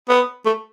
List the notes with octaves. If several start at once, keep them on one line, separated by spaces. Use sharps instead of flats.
B3
A3